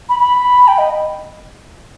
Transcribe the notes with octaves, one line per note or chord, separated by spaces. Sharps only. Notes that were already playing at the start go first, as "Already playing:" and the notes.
B5
B5
G5
D#5